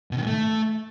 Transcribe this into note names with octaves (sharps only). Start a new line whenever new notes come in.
B2
D#3
G#2
A3